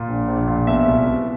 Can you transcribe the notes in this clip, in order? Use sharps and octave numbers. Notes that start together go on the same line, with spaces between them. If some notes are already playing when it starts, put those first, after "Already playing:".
Already playing: A#2
A#1
A#1
A#2
B2 E5
C2
C2